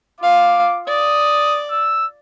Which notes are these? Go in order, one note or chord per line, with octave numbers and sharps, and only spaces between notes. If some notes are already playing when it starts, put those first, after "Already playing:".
F4 F5 D6
D5 D#6
E6